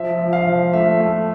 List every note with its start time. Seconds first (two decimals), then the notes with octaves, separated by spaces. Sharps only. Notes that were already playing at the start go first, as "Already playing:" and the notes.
Already playing: F3 E5
0.19 F3
0.33 F5
0.47 F3
0.73 A3 E5
1.00 A3